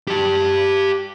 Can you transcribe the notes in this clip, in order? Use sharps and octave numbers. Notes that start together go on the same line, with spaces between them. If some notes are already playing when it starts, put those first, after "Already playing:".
G4 A5